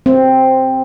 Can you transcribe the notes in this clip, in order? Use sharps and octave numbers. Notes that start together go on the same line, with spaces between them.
C4